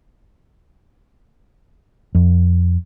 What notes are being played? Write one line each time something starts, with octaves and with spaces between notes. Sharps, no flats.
F2